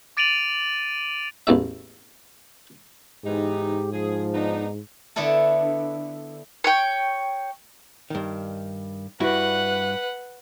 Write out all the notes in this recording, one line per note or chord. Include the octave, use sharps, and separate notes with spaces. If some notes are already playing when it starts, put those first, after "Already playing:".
D6 A6 D7 D#7 F7 F#7
A1 E2 A3 E5
G#2 E3 B3 D#4 G4
F3 G#4
B3 D4 D#4
D3 B3 D4 E4 A4 A5
C#5 G5
G2 D#3
G2 E4 F#4 B4 F#5